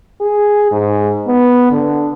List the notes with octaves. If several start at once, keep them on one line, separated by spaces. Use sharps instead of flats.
G#4
G#2
B3
D3